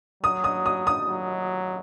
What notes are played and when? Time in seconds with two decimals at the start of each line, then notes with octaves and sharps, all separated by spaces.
0.23 F#3 D#6
0.44 D#6
0.66 D#6
0.87 D#6
1.07 F#3